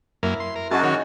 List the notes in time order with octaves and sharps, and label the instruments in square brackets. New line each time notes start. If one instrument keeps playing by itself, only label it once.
[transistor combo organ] F#2 A#3 [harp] E4
[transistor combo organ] C6
A#4
[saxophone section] F#2 [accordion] F#4 [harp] G#4 D#5 [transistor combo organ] A5
[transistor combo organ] D#3 C#4